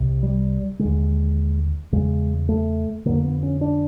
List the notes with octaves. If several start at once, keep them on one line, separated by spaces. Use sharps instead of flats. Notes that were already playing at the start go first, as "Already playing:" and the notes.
Already playing: C2 C3
G3
D#2 D3 G#3
E2 C#3 G#3
A3
F2 D3 A#3
B3
C#4
D4